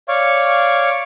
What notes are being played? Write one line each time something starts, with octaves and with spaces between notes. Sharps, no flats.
C#5 D5 F5 C#6